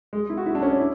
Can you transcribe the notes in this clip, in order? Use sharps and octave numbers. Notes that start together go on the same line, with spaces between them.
G#3
E4
F#4
E4
D4
C#4
D4
E4